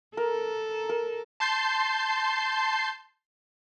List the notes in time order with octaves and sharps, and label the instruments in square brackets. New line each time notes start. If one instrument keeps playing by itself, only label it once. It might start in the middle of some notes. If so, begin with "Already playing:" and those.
[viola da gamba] A4 [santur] A#4
[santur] A#4
[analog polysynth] A5 C6 G6 C7